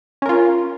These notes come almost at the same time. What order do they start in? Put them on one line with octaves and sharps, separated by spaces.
C#4 A#4 F4